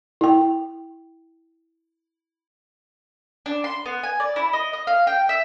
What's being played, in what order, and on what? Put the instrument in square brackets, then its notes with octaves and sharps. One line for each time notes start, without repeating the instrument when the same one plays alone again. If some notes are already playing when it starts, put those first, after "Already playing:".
[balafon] E4 G5
[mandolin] D4
C6
B3
G#5
D5
E4
D#5
D#5
F5
G5
E5